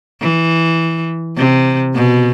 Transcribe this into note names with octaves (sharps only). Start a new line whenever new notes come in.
E3
C3
B2